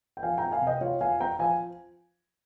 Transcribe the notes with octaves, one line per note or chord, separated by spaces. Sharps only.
G5
F3 F5 G#5
C4 G5 A#5
F5 G#5
C3
D#5 G5
F4 C#5 F5
F4 F5 G#5
C4 G5 A#5
F3 F5 G#5